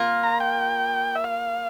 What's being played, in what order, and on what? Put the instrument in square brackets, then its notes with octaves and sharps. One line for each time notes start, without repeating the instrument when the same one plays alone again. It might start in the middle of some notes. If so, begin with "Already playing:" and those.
Already playing: [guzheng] A#3 F4 A#4
[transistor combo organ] A#5
G5
E5
F5